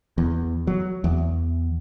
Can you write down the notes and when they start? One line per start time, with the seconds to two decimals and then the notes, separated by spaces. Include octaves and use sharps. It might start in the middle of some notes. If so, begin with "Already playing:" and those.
0.18 E2
0.67 F#3
1.04 E2